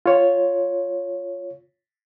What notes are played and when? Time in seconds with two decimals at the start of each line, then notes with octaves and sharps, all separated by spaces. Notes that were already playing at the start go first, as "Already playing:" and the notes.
0.06 F4 C#5